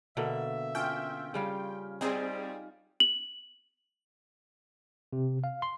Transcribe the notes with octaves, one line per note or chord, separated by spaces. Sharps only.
B2 D3 A#3 E5
C#4 F4 G5
C#3 G3 F5
G3 C4 D#4 G#4
F#7
C3
F5
C6